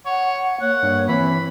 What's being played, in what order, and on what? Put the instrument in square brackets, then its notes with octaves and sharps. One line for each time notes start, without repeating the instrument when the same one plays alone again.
[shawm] C#5 [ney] F#5
[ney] A#3 [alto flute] C#5 [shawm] F#5
[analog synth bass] G2
[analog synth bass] E3 [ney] C4 [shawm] B5